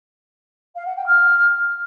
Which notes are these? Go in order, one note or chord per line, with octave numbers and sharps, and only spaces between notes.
F5
F#5
G5
F6